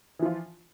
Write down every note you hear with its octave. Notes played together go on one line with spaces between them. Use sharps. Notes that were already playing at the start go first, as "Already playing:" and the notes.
E3 F3 F4